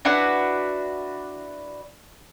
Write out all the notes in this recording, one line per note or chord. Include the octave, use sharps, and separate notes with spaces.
D4 E4 F#4 B4